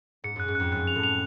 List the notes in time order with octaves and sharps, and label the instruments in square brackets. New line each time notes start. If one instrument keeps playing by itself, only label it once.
[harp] G#2 [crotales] C#7
[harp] F#2 [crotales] F#6
[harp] G#2
[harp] F2 [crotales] F#6
[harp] F#2 [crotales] F#6
[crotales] F7
[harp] A2
[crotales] F7